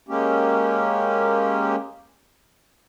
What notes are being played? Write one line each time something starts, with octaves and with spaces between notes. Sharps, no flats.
G#3 A#3 C#4 G4